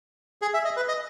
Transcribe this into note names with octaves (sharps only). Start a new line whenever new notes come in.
G#4
E5
D#5
B4
D#5